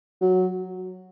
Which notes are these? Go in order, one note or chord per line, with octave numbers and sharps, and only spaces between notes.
F#3